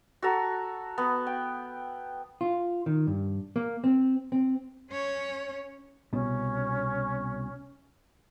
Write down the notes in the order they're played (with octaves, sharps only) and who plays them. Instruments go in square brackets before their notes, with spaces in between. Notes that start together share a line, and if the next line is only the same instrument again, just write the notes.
[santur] F#4 A4 A#5
B3
G5
[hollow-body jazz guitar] F4
D#3
G2
A#3
C4
C4
[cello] C#4 C#5
[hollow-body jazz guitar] C2 B2 [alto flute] C#4